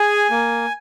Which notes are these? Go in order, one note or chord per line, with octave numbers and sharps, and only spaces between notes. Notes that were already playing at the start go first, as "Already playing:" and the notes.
Already playing: G#4 G#5
A#3